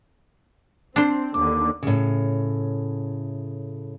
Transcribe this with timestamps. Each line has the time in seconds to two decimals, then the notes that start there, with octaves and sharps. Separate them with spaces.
0.96 C4 D4 C5
1.34 D#2 D3 D6
1.83 A2 C#3